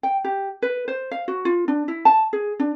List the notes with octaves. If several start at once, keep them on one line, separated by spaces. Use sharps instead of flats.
G5
G4
B4
C5
F5
F#4
F4
D4
E4
A5
G#4
D4